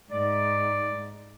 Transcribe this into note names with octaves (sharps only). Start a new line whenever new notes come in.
G#2 D5